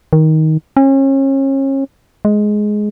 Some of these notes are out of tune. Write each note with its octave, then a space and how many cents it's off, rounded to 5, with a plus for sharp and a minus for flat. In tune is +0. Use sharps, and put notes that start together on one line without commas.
D#3 +15
C#4 -35
G#3 +10